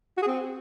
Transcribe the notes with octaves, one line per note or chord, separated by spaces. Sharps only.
F#4
G#4
C4